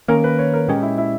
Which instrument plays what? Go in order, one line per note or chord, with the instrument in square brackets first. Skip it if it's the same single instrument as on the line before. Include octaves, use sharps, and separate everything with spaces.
[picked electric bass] D#3 A#3 C#4 [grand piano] A#4
[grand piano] B4
C#5
A#4
[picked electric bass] A#2 G#3 C#4 [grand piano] G4
[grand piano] E4
E4